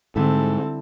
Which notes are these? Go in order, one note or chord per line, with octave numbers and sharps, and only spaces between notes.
G#2 D3 G3 C4 E4 A4